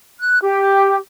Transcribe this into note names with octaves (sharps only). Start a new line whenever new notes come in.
F#6
G4